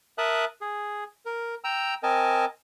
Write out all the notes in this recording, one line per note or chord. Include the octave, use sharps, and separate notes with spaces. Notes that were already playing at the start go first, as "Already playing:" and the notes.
A#4 E5 A5 D#6 F#6
G#4
A#4
G5 A#5 E6
C4 A#4 D#5 G#5 A5